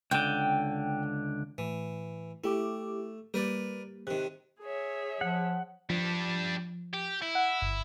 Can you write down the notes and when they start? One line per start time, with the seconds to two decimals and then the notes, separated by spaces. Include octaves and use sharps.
0.11 C#2 D3 G5
1.58 A2 E3
2.44 A3 E4 G4 D6
3.34 G3 A#3 A#4 B4 D5
4.07 C3 D#3 F#6
4.61 G#4 C#5 E5
5.21 F3 F#5
5.90 F3 G3 D4
6.93 G4
7.22 E4
7.35 F#5
7.62 G1